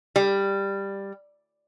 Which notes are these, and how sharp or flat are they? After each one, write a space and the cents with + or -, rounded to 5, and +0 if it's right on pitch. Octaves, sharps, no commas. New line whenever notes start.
G3 +10